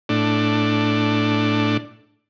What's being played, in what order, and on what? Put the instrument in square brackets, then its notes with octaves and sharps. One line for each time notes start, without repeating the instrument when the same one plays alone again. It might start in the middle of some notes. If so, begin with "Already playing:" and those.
[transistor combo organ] A2 D4